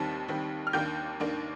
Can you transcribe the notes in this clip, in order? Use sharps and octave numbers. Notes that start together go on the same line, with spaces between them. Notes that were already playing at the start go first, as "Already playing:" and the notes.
Already playing: D#2 D#3 G3 C4 A5
D#2 D#3 G3 C4
F6
D#2 D#3 A#3 D4 G5 G6
D#2 D#3 A#3 D4